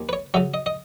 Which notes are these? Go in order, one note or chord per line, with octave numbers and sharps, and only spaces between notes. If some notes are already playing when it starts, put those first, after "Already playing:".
Already playing: D#2
B4
C#5
C#3 F#3 E5
D#5
D#5